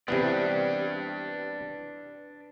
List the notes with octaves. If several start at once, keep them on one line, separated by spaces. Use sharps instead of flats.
C3 E3 B3 D4 B4 D5